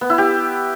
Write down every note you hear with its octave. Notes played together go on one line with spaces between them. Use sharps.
B3
E4
G4